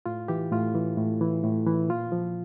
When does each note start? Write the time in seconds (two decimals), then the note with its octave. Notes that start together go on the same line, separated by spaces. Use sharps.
0.06 A2 F4
0.28 E3 G4
0.51 A2 F4
0.75 E3
0.98 A2
1.21 E3
1.44 A2
1.67 E3
1.89 A#2 F4
2.12 F3